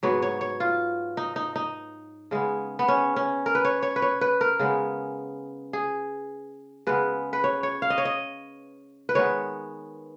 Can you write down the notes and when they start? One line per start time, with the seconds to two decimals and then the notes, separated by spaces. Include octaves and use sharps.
0.03 G#2 F#3 B3 C#5
0.22 C#5
0.41 C#5
0.60 F4
1.17 D#4
1.36 D#4
1.56 D#4
2.31 C#3 G#3 B3
2.79 B3
2.88 C#4
3.16 C#4
3.46 A#4
3.55 B4
3.65 C#5
3.83 C#5
3.96 B4
4.02 C#5
4.21 B4
4.41 A#4
4.59 C#3 G#3 B3
5.73 G#4
6.87 C#3 G#3 B3 B4
7.33 B4
7.44 C#5
7.63 C#5
7.82 F5
7.90 D#5
7.98 C#5
8.05 D#5
9.09 B4
9.15 D#3 G#3 B3 C#5